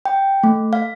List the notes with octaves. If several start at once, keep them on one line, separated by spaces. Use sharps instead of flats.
G5
A3
F5